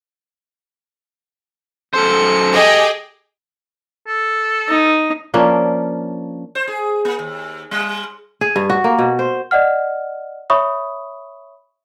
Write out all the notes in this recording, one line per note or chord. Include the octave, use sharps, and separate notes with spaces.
F#2 A4 C5 C#7
G4 G#4 D#5
A4
D#4
F3 A#3 C#4 D4
C5
G#4
A#3
D#2
G3
G#4
G2
F#4
A#3
B2
C5
D5 D#5 F#5 F6
C#5 E5 B5 C#6 D#6